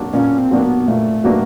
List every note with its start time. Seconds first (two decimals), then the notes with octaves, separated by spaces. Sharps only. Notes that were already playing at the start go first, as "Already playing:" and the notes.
Already playing: F#3 A#3 D4 F#4
0.13 A#2 C#4
0.38 C4
0.51 F#3 A#3 D4 F#4
0.63 B3
0.88 A#2 A3
1.24 F#3 A#3 D4 F#4